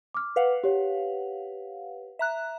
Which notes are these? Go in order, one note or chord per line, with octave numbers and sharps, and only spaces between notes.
D6 F6
B4 F5 F#5
G4 C#5
E5 A#5 F#6